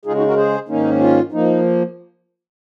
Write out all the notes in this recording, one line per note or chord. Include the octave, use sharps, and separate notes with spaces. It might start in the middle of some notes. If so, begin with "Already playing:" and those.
C#3 G#3 D#4 F4 G#4
D#4 F#4
F#4 A#4
G#4 C5
G#2 D#3 A#3 C#4 D#4
F4
F3 A#3 D#4